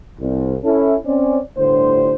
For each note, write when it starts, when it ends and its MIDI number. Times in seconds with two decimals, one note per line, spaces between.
0.20 0.56 36
0.64 0.94 61
0.64 0.94 64
0.64 0.94 69
1.05 1.38 60
1.05 1.38 61
1.05 1.38 74
1.57 2.14 31
1.57 2.14 45
1.57 2.14 50
1.57 2.14 72